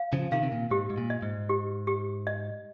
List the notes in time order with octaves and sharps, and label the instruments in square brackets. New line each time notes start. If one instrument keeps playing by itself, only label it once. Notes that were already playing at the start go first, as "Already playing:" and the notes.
Already playing: [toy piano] F5
[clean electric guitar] C#3 F3
[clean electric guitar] C3 D#3 [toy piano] F5
[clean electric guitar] C3
A#2
[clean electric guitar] G#2 [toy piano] G4
[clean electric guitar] G#2
A#2
[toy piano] D#5
[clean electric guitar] G#2
[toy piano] G4
G4
D#5